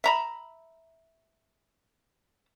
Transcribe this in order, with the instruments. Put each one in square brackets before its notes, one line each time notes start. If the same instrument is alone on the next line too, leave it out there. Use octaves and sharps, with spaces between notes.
[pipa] E5 A#5 B5